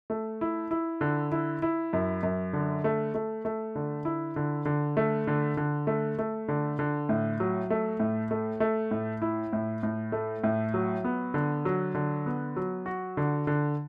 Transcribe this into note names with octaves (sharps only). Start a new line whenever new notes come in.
A3
E4
E4
D3
E4
E4
F#2
F#2
D3
A3
A3
A3
D3
E4
D3
D3
A3
D3
D3
A3
A3
D3
D3
A2
F#3
A3
A2
A3
A3
A2
E4
A2
A2
A3
A2
F#3
B3
D3
F#3
D3
B3
F#3
F#4
D3
D3